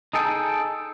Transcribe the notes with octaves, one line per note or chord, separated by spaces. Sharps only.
D#4 G#4 A4 G5